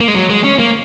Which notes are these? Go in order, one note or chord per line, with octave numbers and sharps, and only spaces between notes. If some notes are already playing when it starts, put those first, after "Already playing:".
A#3
G#3
F#3
G#3
C#4
A#3